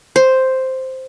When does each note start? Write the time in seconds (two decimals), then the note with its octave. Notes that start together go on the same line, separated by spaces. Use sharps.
0.16 C5